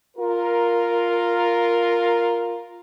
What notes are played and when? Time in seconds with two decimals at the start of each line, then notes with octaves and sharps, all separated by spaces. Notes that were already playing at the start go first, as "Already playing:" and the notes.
0.17 F4 A#4